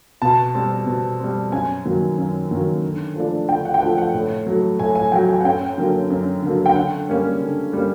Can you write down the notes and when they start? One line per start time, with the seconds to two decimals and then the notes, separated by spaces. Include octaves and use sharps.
0.22 B2 A5
0.54 G3 C4
0.87 B2
1.20 G3 C4
1.52 F#2 G#5
1.85 D#3 F#3 A#3
2.18 F#2
2.51 D#3 F#3 A#3
2.84 D3
3.16 F3 A3 D4
3.48 D3 G5
3.65 F#5
3.74 G5
3.81 F3 A3 D4 F#5
3.98 F#5
4.14 A2
4.47 F#3 A3
4.79 A2 G#5
4.95 G#5
5.12 F#3 A3 G5
5.29 G#5
5.41 F#5
5.45 F#2 G5
5.78 D3 F#3 A#3
6.10 F#2
6.42 D3 F#3 A#3
6.66 G5
6.75 D3 F#5
7.09 G3 A#3 C#4
7.40 D3
7.73 G3 A#3 C#4